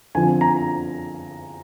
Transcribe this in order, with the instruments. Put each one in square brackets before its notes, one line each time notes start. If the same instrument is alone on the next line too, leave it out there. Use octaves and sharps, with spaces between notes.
[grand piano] D3 F3 C4 G#5
A#5